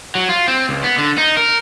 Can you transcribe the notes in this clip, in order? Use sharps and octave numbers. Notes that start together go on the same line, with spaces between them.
F#3
F4
C4
C#2
B3
D3
D#4
A#4